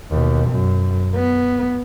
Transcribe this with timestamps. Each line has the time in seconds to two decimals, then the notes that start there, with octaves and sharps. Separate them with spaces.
0.11 D#2 B2
0.50 F#2
1.15 B3